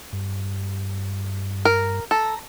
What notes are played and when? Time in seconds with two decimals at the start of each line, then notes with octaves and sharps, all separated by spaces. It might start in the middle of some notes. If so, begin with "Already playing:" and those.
0.13 G2
1.65 A#4
2.11 A4 A#5